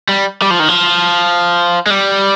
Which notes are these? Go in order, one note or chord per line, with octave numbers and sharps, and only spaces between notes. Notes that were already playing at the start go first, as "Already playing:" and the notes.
G3
G3
F3
D#3
F3
G#3
G3